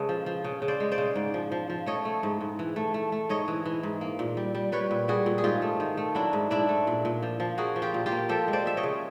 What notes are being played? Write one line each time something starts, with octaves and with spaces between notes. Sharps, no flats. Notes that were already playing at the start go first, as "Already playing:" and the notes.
Already playing: C#3 G#3 A4 B4
F3
F3
C#3
C#3
C5 D5
G#3
C5 D5
C#3
G#2
F3
F3
F3
A3 C#5 D#5
A3
G#2
G#2
E3
A3
A3
A3
G#2 C#5 D#5
E3
E3
G#2
A#3
A#2
G3
G3
G3 B4 C#5
A#2
G3 F#4 G#4
A#2
G#4
G#2 F4 G4
A3
D#3
A3
F#3 D4 E4
G#2
G#2 D4 E4
A3
A#2
A#2
F3
F3
A#3 F#4 G#4
F3
F4 G4
A#2
F4 G4
A#3
F3 G4 A4
G#3
C5 D5
F3 E5
C#5 D#5
C#3